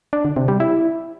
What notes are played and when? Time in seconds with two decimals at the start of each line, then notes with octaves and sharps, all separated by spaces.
0.13 D4
0.25 D3
0.36 C3
0.48 G3
0.60 E4